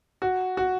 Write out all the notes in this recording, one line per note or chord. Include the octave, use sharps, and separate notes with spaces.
F#4
F#4